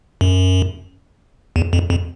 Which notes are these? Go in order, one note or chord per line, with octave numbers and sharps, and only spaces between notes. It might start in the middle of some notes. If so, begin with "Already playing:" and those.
F#2
E2
F2
F2